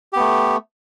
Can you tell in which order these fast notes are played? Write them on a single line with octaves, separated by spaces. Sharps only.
G4 B3 A3